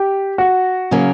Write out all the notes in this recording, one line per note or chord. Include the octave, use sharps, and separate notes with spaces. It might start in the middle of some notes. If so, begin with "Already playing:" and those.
Already playing: G4
F#4
C#3 F#3 A#3 C#4